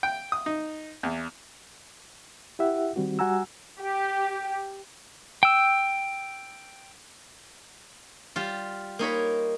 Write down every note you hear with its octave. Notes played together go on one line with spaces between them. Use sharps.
G5
D#6
D#4
E2
E4 G4 E5 F#5
D#3 G3 C4 F#4
G3 F#4 F#5 G#5 A#5 E6
G4
G5 E6
G3 F4
A#3 D#4 C#5 B5